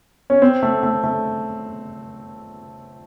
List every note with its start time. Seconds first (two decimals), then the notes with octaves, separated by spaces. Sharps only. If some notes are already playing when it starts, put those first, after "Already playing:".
0.30 C#4
0.42 C4
0.63 A3
0.83 A3
1.04 A3